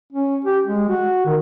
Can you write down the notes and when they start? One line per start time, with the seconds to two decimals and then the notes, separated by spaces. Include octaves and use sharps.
0.12 C#4
0.45 G4
0.66 G#3
0.89 F#4
1.26 D#3